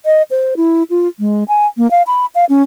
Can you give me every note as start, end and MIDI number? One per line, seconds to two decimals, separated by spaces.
0.06 0.22 75
0.31 0.54 72
0.57 0.83 64
0.90 1.08 65
1.20 1.44 56
1.48 1.66 80
1.78 1.89 58
1.91 2.02 77
2.07 2.26 83
2.35 2.45 77
2.49 2.62 61